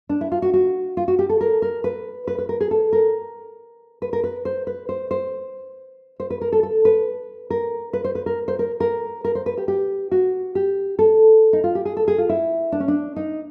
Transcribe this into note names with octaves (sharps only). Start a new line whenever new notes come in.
D4
E4
F4
F#4
F#4
F4
F#4
G4
A4
A#4
A#4
B4
B4
B4
A#4
G#4
A4
A#4
B4
A#4
B4
C5
B4
C5
C5
C5
B4
A#4
A4
A4
B4
A#4
B4
C5
B4
A#4
C5
A#4
A#4
A#4
C5
B4
G4
G4
F#4
G4
A4
D#4
F4
G4
G#4
A4
G#4
F4
E4
D4
C#4
D4
D#4